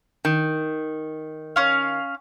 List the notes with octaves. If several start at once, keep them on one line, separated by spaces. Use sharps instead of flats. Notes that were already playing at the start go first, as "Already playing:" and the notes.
D#3
C#4 F5